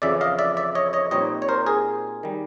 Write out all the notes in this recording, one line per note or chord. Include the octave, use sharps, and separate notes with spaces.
F2 C#3 E3 D5 E5
D#5 F5
D5 E5
D5 E5
C#5 D#5
C#5 D#5
A#2 G3 C4 D#4 C#5 D#5
C#5
A#4 C5
G#4 A#4
D#3 G3